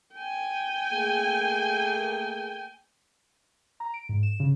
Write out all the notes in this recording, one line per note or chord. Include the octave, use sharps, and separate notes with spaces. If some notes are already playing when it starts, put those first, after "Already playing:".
G5 G#5
A3 A#3 G#4
A#5
D7
G#2
E7
C#3